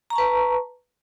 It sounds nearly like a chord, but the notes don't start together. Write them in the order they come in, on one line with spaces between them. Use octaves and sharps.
A#5 C#6 A5 B4